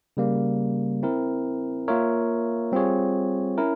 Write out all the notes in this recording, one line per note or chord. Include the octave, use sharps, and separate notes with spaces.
C#3 G3 A#3
C4 E4 A#4
A#3 F4 A#4 C#5 E5
G3 C4 F4 G#4 C#5
C#4 E4 A#4